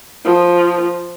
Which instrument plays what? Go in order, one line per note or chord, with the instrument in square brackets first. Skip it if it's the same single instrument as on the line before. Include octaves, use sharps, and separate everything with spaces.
[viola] F3